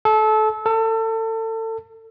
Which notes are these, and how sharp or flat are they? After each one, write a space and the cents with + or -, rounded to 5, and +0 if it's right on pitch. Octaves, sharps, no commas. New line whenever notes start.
A4 -25
A4 +30